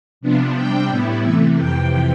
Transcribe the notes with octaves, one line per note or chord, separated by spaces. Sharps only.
C3 F3 B3 D4
C3 G3 D4 G5
A2 G3 B3 E4
C3 E3 A3 E5
F2 C3 E3 G5